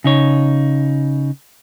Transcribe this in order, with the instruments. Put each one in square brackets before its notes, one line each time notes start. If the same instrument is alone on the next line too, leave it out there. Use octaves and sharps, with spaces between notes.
[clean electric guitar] C#3 D#4 C#5